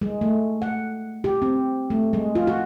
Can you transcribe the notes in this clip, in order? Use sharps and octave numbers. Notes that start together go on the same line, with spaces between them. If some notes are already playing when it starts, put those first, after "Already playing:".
G#3
A3
F#5
G4
C4
A3
G#3
F4
F#4